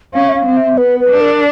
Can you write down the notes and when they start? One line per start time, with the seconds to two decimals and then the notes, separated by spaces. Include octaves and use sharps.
0.14 C#4 F5
0.29 E5
0.35 F5
0.46 C4
0.57 E5
0.78 B3 B4
1.00 B4
1.10 D4
1.21 A#4